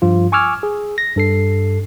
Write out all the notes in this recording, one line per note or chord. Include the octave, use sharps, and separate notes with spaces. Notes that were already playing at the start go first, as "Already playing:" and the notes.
G2 F3 F4
G#5 C#6 D6 E6 F6 G#6
G#4
A#6
G2 A4 C7